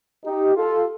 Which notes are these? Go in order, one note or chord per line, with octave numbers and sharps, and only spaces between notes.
D#4 G4
F4 A4